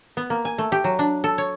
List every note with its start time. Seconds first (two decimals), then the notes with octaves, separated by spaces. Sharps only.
0.17 B3
0.30 A#3
0.45 G#5
0.58 A3
0.72 G4
0.84 F#3
0.99 D4
1.24 A4
1.38 C#5